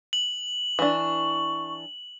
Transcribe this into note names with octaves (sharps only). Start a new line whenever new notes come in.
F#7
E3 D4 C#6